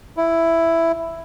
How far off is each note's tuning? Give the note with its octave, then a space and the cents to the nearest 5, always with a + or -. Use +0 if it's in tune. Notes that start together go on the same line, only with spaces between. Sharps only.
E4 +5